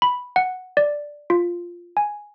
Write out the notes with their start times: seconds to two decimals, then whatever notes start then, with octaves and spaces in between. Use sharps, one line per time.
0.02 B5
0.36 F#5
0.77 D5
1.30 F4
1.97 G#5